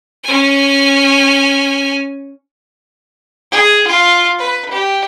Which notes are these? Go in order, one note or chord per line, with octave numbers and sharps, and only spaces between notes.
C#4 G#5
G#4
F4
B4
G4